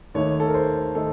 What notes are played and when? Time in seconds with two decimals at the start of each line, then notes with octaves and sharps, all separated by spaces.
0.14 D#2 D#3 A3 D#4 C#5
0.40 A4
0.47 A#4
0.54 C5
0.95 D#3 A3 D#4 A4